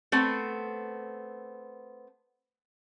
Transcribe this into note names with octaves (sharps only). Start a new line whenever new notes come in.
A3 B3 C4